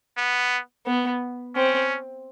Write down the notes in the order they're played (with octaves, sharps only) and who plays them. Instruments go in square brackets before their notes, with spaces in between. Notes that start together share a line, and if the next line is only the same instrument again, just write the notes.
[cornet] B3
[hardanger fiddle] B3
[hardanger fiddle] C4 [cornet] C#4